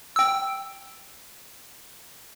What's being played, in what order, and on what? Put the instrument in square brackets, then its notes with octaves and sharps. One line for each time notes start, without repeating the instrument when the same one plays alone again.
[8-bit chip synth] G5 E6